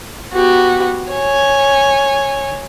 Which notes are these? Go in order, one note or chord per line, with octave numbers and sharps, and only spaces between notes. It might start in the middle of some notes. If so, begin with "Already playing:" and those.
B3 F#4 G4
C#5 G#5